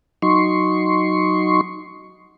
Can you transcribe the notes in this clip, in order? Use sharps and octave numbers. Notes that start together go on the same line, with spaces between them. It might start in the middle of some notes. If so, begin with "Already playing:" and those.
F#3 D#4 C6 C#6